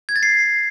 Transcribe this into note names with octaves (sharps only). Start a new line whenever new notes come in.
G#6
A6
C7